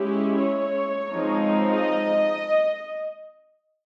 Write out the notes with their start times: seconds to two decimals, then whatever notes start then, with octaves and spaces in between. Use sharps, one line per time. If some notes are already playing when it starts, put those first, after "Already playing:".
Already playing: G#3 C#4 E4 G4
0.42 C#5
1.08 F3 G#3 C4 D#4
1.74 D#5